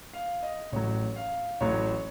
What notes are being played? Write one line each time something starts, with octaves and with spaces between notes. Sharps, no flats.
F5
D#5
A1 A2 F#3 C#5
F5
A1 A2 F#3 C#5